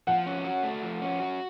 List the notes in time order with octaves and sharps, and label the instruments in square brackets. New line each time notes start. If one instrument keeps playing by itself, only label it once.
[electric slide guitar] F3 [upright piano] F#5
[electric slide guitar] C#4
F#4
A3
F3
C#4
F#4